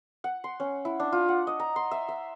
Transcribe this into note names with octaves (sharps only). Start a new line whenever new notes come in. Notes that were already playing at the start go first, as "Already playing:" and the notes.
F#5
C6
C#4
E4
D4
F4
F#5
D#5
A#5
C6
E5
E5